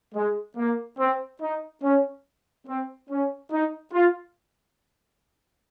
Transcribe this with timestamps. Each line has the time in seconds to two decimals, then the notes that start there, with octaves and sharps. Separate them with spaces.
0.15 G#3
0.57 A#3
0.99 C4
1.41 D#4
1.83 C#4
2.67 C4
3.10 C#4
3.51 D#4
3.93 F4